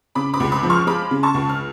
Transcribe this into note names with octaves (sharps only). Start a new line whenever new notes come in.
C#3 B5 D6
B5 D6
C#2
B5 D6
F3
C#6 F6
G#3 B5 D6
C#3
A5 C#6
C#2
F6